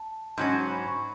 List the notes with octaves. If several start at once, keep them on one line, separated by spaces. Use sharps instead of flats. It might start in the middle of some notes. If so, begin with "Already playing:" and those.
Already playing: A5
G#2 F#3 C#4
B5
C#6